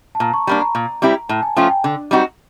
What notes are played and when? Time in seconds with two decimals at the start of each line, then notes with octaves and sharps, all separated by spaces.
0.15 A5
0.20 A#2 A#5
0.34 C#6
0.47 G3 A#3 D4 B5
0.61 A#5
0.75 A#2
1.02 G3 C4 E4 G4
1.29 A2 A5
1.43 G#5
1.56 F3 A3 C#4 F4 G5
1.70 G5
1.84 D3
2.11 G3 C4 D#4 F#4